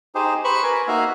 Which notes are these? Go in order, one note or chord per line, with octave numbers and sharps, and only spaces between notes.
D#4 G4 G#4 C5
B4 C5 B5 C#6
A#4 G#5
A#3 D#4 F#4 E5 F5